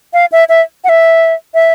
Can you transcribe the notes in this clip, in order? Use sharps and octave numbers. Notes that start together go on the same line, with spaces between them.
F5
E5
E5
F#5
E5
E5